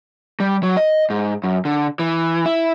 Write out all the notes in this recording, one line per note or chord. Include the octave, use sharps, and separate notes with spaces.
G3
F#3
D#5
G#2
F#2
D3
E3
E4